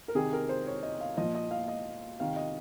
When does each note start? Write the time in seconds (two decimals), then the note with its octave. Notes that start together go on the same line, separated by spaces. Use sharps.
0.08 A#4
0.15 C3 D#3 G#4
0.33 A#4
0.49 C5
0.67 C#5
0.83 D#5
1.01 F5
1.17 A#2 F3 D#5
1.35 D#5
1.51 F5
1.68 D#5
2.20 C3 D#3 F5
2.36 D#5